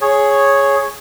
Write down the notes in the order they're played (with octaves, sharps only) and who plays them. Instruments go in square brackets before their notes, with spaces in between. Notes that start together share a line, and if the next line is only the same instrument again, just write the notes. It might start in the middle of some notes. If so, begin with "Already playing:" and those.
[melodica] G#4 C#5